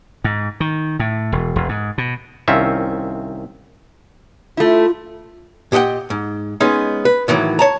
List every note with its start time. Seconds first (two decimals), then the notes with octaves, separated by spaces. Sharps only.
0.24 G#2
0.60 D#3
0.99 A2
1.32 E1
1.56 E1
1.69 G#2
1.98 B2
2.48 C2 D#3 C4 C#4 F4 E5
4.57 A3 E4 F4
5.72 A#2 G4 D#5 F#5 G5
6.10 G#2
6.60 G#3 B3 C#4 D#4
7.05 B4
7.28 A2 D#3 E3 F#3
7.59 C#5 A5 A#5